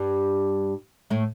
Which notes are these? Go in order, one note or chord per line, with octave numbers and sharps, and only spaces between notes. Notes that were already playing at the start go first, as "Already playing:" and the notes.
Already playing: G2 G3
A2 A3